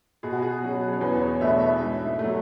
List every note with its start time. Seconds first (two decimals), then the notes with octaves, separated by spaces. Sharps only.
0.23 B2 G#4
0.32 F#4
0.42 G#4
0.62 F#3 C#4
0.93 C#5
1.01 E2 B4
1.21 C#5
1.40 B2 A3 D4 E5
1.60 E5
1.80 G#2
2.19 A3
2.24 F#3